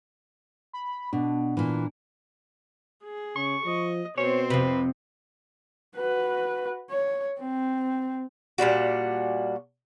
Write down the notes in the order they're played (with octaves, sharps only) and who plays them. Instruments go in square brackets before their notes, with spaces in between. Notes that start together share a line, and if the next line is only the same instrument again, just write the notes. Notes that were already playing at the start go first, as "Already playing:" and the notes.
[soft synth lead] B5
[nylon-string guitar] B2 [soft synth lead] D4
[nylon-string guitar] A#2 E3
[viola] G#4
[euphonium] C#3 [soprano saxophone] C#6
[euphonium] F3 [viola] D#5
[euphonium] B2 [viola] C4 C5 [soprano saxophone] C#5
[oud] F2 C3 [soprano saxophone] B4
[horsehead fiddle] F#4 B4
C#5
C4
[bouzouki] A#2 G3 D4 F#4